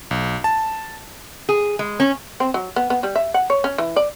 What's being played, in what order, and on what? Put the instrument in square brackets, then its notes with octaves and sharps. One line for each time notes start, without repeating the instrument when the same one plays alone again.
[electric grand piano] B1
A5
[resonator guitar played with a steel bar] G#4
G#3
C#4
[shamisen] C4
F#3
B3
B3
G3
E5
F#5
C#5
C#4
E3
D5